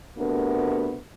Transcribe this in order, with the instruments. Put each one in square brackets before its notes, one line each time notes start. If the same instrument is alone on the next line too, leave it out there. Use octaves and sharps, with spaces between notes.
[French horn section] C3 A3 B3 D4 F#4 A#4